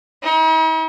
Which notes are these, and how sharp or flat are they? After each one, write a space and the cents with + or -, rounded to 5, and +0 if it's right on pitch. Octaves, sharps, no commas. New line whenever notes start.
D#4 +45